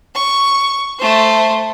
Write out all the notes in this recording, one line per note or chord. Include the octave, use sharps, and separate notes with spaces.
C#6
A3 C5